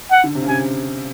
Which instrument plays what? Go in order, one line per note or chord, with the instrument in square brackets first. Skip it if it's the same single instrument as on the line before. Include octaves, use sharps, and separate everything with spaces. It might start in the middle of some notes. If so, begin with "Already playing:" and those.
[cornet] F#5
[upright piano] D3
C3
C#3
[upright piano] C3 [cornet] G#5